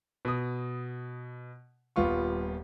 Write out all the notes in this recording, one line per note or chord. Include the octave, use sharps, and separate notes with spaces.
B2 D#6
D#1 G3 B3 F4 C#6